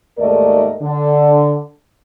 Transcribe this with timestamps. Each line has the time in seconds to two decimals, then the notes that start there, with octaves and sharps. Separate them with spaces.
0.18 D#2 G#2 A3 A#4 D5 D#5
0.81 D3